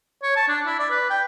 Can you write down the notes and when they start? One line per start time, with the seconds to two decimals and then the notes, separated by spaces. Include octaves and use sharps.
0.23 C#5
0.36 A5
0.48 D4
0.66 E4
0.79 D5
0.90 B4
1.10 G5